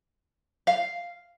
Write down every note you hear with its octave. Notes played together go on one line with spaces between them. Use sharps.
F5